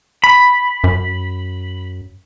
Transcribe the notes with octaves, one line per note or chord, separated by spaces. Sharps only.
B5
F#2